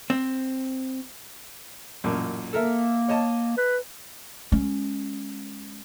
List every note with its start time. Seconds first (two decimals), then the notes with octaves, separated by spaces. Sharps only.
0.10 C4
2.04 A1 F#2 A#2
2.53 A#3 A4 A#4 E5
3.08 C#5 D#5 A5
3.57 B4
4.52 G#3 C#4